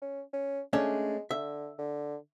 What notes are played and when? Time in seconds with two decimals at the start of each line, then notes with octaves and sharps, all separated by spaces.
0.02 C#4
0.33 C#4
0.73 G#3 A3 C#4 D4
1.31 D3 E5
1.78 D3